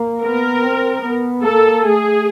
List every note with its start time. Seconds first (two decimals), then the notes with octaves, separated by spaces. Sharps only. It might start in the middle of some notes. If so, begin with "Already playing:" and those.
Already playing: A#3
0.21 B3 A#4
0.62 C4
1.03 B3
1.42 A#3 A4
1.83 A3 G#4